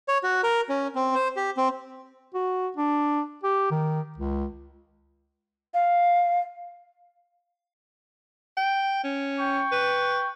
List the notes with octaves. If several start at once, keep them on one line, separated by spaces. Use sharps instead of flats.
C#5
F#4
A#4
C#4
C4
C5
G4
C4
F#4
D4
G4
D#3
C#2
F5
G5
C#4
G5 C#6
B4